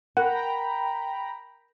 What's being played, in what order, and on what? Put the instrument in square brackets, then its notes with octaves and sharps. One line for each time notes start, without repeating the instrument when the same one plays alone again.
[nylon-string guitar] A#4 [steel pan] F#5 [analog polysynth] G5 A#5 B5